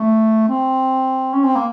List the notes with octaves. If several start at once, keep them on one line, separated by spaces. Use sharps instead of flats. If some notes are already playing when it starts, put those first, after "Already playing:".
Already playing: A3
C4
C#4
C4
A#3